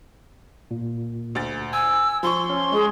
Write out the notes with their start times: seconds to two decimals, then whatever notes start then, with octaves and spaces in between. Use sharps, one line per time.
0.71 A#2
1.35 D2 A6
1.73 G#5 E6
2.23 F3 C6 C#6
2.50 C#4
2.73 G#3 G#4